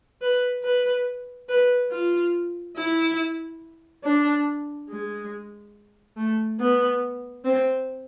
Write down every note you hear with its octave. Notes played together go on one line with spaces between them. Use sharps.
B4
B4
B4
F4
E4
D4
G#3
A3
B3
C4